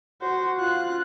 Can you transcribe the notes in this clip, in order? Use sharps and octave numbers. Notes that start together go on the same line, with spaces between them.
F#4 C5
F4 F#6